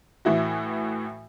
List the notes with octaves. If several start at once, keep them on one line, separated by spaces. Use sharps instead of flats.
A2 E3 E4 F#4